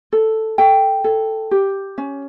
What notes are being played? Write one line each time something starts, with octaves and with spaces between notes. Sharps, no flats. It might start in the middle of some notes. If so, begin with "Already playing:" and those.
A4
A4 G5
A4
G4
C#4